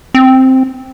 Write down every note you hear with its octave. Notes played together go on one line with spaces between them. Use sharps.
C4